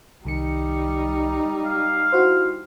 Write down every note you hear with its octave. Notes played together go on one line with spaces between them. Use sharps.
C2 D#3 G3 D#4 C#7
F5
E4 F#4 C5